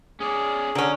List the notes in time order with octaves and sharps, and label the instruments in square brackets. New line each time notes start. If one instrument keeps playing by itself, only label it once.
[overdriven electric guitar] C#4 D5 [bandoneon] G#4
[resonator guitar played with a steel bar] D3 [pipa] F#3 C#4